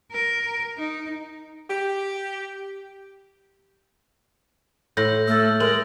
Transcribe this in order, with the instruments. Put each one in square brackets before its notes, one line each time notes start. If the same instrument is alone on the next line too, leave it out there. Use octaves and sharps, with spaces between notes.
[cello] A#4
D#4
[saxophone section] G4
[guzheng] A2 C6 [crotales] G6 A#6 F#7
[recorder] A3 [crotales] E6 F6 A6
[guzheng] G#3 [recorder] A#4 [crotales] F#7